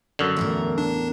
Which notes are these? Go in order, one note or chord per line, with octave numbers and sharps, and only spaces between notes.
F#2 D3
E2 A2 A#4
D4